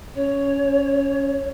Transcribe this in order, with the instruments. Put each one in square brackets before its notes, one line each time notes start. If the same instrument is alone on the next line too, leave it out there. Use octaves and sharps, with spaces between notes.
[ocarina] C#4 [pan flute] C#5